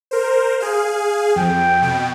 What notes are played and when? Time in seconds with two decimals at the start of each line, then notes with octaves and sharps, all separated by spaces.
0.11 A#4 C5
0.60 G#4 F5
1.36 F2 G5
1.82 B2